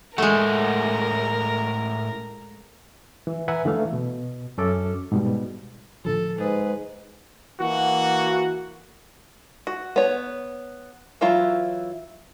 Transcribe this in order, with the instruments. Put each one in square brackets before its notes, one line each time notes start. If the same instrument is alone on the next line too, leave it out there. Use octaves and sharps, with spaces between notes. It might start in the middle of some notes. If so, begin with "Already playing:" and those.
[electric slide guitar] A2 C#4 F#5 [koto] G#3 A3 [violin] A#4
[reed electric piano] E3
B4 E5 F#5 G#5 A#5
D3 E3 A3 F5
B2
F#2 C#4 A4 D6
G#2 B2 G3
[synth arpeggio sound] A2 D3 F3 [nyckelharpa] A4
[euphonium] G#2 [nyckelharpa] G#4 B4
[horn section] E3 A#3 F#4
[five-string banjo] F#4
B3 C#5
E3 F#3 E4 F4